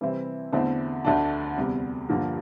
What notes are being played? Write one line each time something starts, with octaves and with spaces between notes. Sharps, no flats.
C3 E3 G3 C4 E4
E2 D3 A3 C4 E4
D2 D3 A3 D4
E2 C3 G3
G2 D3 F3 A#3